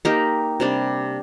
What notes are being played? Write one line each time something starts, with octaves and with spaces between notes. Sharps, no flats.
A#3 D#4 G4 A#4
C3 G3 D4